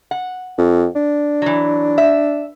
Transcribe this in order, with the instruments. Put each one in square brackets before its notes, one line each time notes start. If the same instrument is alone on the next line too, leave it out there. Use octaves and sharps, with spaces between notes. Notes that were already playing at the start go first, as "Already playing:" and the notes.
[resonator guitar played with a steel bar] F#5
[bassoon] F2
D4
[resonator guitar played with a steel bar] E3 F#3
E5